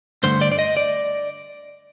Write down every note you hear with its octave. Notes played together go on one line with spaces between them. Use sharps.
G2 D3 A3 C5
D5
D5
D#5
D5